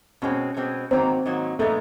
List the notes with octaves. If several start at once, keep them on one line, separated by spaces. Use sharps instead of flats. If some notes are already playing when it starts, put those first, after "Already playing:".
B2 G#3 C4 C#4
B2 G#3 C4
G#2 D#3 F#3 A#3 C4
G#2 D#3 F#3 A#3
A#2 F3 G#3 A3 B3 D#4